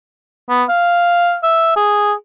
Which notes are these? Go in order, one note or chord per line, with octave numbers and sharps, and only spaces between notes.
B3
F5
E5
G#4